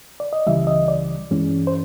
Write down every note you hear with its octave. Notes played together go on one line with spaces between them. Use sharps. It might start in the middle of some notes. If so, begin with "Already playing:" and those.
D5
D#5
C#2 C#3 E3 G3 E5
D#5
D5
G2 E3 G#3 C#4
C5